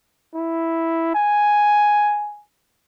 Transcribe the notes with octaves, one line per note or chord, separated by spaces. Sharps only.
E4
G#5